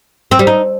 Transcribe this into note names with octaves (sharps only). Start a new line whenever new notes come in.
C4
G3
D#4